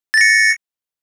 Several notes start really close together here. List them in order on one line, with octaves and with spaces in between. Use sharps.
A6 A#6 C#7